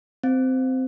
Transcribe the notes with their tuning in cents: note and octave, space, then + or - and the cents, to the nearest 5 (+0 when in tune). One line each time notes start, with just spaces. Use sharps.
C4 -15